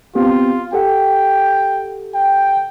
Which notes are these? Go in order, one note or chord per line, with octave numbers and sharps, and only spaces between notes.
B3 C4 F4 G4
G4 A4 F#5 G5
G5